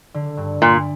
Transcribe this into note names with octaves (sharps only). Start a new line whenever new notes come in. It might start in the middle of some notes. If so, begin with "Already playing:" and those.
D3
G2
G2 A#2